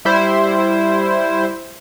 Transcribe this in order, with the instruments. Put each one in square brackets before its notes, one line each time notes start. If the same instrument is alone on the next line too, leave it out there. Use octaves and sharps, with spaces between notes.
[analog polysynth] G3 E4 C5